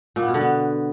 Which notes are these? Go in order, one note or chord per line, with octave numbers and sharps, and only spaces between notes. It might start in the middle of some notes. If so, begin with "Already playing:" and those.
A#2
B3
B2
D3
B3